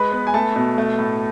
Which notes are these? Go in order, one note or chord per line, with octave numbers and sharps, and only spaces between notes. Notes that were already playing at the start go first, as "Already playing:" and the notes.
Already playing: G#3 B4 B5
B3
G#5
A3 A4 A5
B2
A3
A2